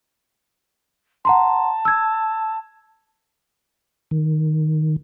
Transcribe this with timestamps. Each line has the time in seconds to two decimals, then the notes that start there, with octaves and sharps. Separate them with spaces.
1.25 F#5 A5 A#5 C6
1.85 E6 G#6
4.11 D#3